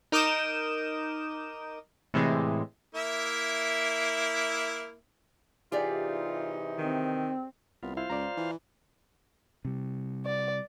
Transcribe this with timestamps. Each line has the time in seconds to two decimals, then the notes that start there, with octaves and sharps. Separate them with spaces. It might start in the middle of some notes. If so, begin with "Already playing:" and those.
0.12 D#4 A#4 D6 D#6 G6 E7
2.14 A2 C3 E3 G#3
2.95 A#3 E4 E5
5.72 C3 E3 D#4 F4 G4 G#4 D5
6.79 D#3 C4
7.83 C2 B3 F4
7.97 E4 F4 C5 F5
8.10 C#2 D5 A#5
8.37 E3
9.65 C3 G3
10.26 D5